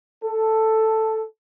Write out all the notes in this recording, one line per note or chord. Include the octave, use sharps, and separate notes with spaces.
A4